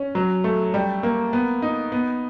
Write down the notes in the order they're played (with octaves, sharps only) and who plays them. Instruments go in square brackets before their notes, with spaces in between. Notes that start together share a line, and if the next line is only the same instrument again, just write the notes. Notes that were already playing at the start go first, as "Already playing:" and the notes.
Already playing: [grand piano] C#4
F#3
A3
G3
A#3
B3
D#4
B3